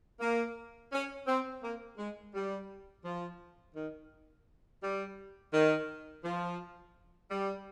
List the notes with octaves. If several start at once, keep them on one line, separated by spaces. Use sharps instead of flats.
A#3
C#4
C4
A#3
G#3
G3
F3
D#3
G3
D#3
F3
G3